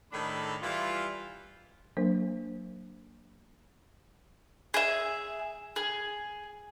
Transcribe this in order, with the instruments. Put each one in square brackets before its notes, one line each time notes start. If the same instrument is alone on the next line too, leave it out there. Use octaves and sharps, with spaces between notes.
[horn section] A2 D#3 D4 G#4 A4 B5
E3 G3 E4 F4
[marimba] F#3 A#3 D4 A#4 C5
[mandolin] G#4 E5
G#4